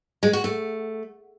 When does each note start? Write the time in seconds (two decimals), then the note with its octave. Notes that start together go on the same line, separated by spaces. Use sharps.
0.23 G#3
0.33 F#4
0.44 A3